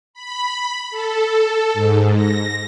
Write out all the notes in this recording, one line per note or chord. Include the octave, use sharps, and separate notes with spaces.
B5
A4
G#2
A#6